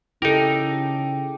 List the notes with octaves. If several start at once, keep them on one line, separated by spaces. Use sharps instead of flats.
C#3 D#4 E4 G4 A4 A#4